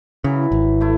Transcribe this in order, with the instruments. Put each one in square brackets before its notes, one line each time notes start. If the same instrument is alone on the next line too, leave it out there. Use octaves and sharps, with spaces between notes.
[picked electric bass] C#3 [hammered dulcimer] E3 F#3
[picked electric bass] G#1
[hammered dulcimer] A3 E4